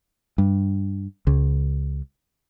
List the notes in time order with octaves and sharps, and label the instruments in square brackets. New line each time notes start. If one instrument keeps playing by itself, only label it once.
[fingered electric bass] G2
C#2